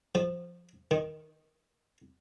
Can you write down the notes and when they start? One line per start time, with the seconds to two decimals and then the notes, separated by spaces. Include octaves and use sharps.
0.15 F3
0.91 D#3